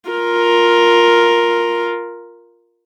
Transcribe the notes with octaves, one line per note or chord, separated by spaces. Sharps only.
F4 A#4